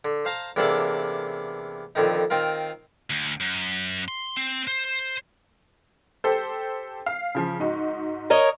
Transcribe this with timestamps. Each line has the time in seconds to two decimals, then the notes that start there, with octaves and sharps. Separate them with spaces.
0.05 D3
0.25 C5 F5 A5 A#5
0.56 E2 C3 A#3 D4 A4 D5
1.95 F2 D3 D#3 D#4
2.30 D#3 C4 F4 A#4
3.10 D2
3.40 F#2
4.08 C6
4.37 C4
4.67 C5
6.24 G4 A4 C5
7.06 F5
7.35 C#3 F3
7.60 G#2 D#4 F#4
8.30 A#4 C#5 D#5